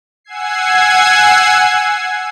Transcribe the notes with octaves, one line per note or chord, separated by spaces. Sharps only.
F#5 G#5 E6 G#6 C7